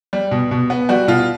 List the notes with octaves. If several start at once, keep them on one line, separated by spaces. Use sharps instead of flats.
G3
B2
B2
B3
G3 F#4
B2 F4